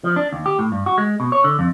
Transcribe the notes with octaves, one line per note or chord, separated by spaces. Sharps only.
F3
D4
D#2
G4
A2
G2
F#4
G#3
B2
C#5
D3
F2